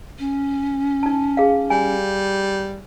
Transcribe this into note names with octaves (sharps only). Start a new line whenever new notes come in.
C#4
D#4 A5
G#4 F5
G3 G#5